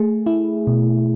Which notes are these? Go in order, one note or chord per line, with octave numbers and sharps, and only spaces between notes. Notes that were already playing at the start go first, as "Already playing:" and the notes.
Already playing: A3 G#4
E4
B2